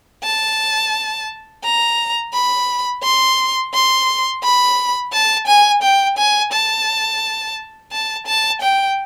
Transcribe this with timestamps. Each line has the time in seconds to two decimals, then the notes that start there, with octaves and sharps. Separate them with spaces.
0.24 A5
1.64 A#5
2.34 B5
3.04 C6
3.74 C6
4.44 B5
5.13 A5
5.47 G#5
5.83 G5
6.18 G#5
6.53 A5
7.92 A5
8.27 A5
8.62 G5